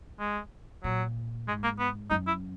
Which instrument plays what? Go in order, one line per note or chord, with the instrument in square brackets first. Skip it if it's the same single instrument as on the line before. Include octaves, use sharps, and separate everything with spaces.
[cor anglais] G#3
[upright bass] A#2 [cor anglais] F#3
[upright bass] G#2 [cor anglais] G#3
[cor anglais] A#3
B3
[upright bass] F#2 [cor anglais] D#4
[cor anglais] E4